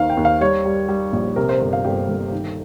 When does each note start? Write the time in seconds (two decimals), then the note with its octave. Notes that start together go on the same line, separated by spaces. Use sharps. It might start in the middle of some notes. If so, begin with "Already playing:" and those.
Already playing: D#2 D#3 F5
0.10 G5
0.17 D#2
0.25 F5
0.41 G3 C#5
0.65 G3
0.89 G3
1.13 A#1
1.36 C3 A#4
1.49 C5
1.60 G1 C5
1.73 F5
1.85 G1 G4
2.09 G1
2.32 D#3